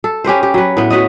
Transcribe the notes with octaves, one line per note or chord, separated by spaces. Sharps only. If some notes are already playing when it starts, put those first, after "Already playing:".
A4
C#4 G4 B4 C5
G4
F#3 B4
A2 B3
F#4 B4 C#5 D#5